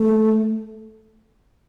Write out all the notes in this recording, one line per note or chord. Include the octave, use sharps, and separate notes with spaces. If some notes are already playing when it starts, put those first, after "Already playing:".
Already playing: A3